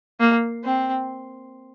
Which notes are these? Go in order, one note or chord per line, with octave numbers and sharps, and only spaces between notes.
A#3
C4